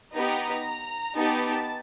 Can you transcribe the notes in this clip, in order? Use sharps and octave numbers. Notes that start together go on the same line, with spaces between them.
B3 D#4 G4 A#5
B3 D#4 G4 A5